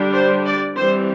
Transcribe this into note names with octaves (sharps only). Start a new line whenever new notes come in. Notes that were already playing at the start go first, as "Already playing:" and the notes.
Already playing: D3 G3 D4
C5
D5
E3 G3 C4 C5